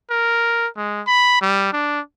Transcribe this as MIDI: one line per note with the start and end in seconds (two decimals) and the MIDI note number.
0.11 0.67 70
0.77 1.02 56
1.07 1.40 83
1.42 1.69 55
1.73 2.00 62